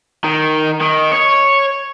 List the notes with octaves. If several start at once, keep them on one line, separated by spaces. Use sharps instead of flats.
D#3
D#3
C#5